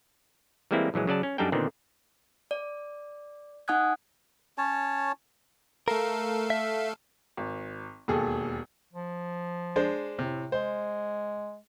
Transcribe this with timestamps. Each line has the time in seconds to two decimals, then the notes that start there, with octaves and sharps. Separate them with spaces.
0.71 E3 G3 G#3 A#3 C4 E4
0.94 A#1 E3 F#3 G#3
1.07 C#3 F#3 D5 A5
1.23 C#4
1.38 F#2 G3 D4 D#4 A4 G5
1.52 A#2 D3 D#3 B3 C4
2.51 D5
3.68 D#4 F#5 G#5 D#6 F#6 G#6
4.58 C#4 C#5 A5
5.88 A3 A4 A#4 F5
6.50 E5
7.37 G#1
8.08 E1 D#2 G#4 A4
8.93 F3
9.76 G#3 D4 C5
10.19 A2 C3
10.52 G#3 C5